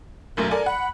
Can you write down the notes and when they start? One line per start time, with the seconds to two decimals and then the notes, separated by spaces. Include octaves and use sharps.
0.37 B1 F#2 A3 A#4
0.51 A4 A#4 D5 G#5
0.66 F#5 B5